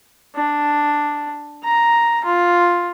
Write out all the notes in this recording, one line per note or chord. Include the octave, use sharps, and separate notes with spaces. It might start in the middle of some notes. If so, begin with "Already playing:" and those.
D4
A#5
F4